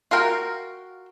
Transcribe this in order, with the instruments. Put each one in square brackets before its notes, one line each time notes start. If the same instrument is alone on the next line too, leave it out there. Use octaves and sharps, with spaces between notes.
[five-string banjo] F4 F#4 A#4 G5